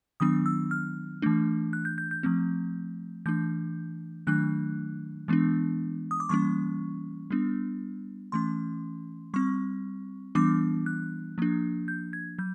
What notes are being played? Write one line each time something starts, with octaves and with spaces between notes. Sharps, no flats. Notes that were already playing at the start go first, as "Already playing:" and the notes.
D#3 F#3 B3 D4 D#6
E6
F6
E3 A3 D4
F#6
G6
G6
G6
F3 A3 C4
E3 A3 D4 G6
D#3 F#3 A3 D4 F#6
E3 G#3 B3 D4
D#6
D6
E3 G3 A#3 C#4 C#6
G3 B3 D4
E3 A3 C#4 C6
G3 C4 C#6
E3 G3 B3 D4 D6
F#6
F3 A#3 D4
G6
G#6
F#3 G6